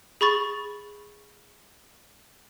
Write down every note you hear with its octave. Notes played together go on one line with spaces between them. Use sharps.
G#4 B5 C#6 A6